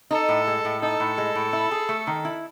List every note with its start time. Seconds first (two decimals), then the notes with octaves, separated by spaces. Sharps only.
0.11 D#4 A4
0.29 A2
0.47 G#3
0.65 A2
0.82 D#4 A4
1.00 A2
1.18 G#3
1.35 A2
1.53 E4
1.71 G#4
1.89 A3
2.07 D#3
2.25 E4